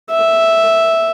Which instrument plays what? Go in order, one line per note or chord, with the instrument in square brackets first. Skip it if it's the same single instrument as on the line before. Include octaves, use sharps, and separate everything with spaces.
[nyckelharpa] E5